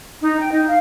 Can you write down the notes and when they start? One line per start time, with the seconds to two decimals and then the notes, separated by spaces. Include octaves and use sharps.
0.21 D#4
0.39 G5
0.51 D#4
0.66 F5